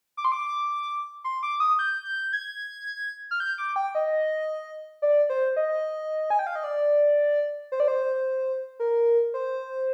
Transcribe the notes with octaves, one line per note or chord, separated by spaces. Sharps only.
D6
C6
D6
C6
D6
D#6
G6
G6
G#6
F6
G6
D6
G5
D#5
D5
C5
D#5
G#5
G5
F5
D#5
D5
C5
D5
C5
A#4
C5